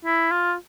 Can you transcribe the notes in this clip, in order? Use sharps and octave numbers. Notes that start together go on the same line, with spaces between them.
E4
F4